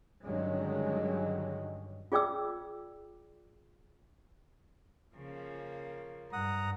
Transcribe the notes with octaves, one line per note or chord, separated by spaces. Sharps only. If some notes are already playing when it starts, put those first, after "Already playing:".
G2 D3 D#3 F#3 G#3 C#4
F4 G#4 D5 G5 D6 E6
C#3 F3 A#3
G2 F#5 A#5 D#6